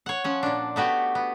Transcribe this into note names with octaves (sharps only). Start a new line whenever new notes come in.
C#5 F#5
F3 C#4 F#5
A#2 D4
A3 B3 F#4 G4
B3